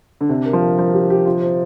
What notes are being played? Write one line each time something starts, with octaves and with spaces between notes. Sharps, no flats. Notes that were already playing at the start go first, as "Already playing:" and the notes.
D3
C3 D4
A#4
F3
A#4
F3 A#4
G4
G4
F4
C5